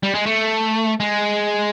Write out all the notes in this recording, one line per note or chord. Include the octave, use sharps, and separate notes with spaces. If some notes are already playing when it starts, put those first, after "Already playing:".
G3
G#3
A3
G#3